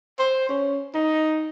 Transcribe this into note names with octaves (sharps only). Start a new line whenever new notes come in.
C5
C#4
D#4